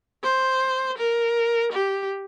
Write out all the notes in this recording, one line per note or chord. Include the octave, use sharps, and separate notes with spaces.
C5
A#4
G4